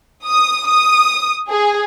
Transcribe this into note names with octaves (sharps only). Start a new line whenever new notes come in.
D#6
D#6
G#4